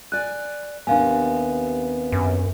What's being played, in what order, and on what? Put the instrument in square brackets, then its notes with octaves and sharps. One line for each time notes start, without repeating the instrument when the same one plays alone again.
[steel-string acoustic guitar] D5 G#5 [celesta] F#6
[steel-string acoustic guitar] D#2 C3 B3 [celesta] D4 F5 G#5
[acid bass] F#2